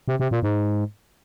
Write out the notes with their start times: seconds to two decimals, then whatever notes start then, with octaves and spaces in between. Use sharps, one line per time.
0.08 C3
0.20 C3
0.31 A#2
0.43 G#2